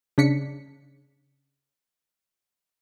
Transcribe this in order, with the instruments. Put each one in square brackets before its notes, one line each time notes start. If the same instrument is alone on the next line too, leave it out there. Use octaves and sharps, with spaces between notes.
[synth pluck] C#3 D4 B6 C#7